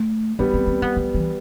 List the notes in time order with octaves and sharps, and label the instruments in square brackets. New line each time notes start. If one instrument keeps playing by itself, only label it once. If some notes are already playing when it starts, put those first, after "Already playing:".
Already playing: [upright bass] A3
[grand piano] G3 B3 [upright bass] D4
[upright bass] C4
C4
B3
F3
E3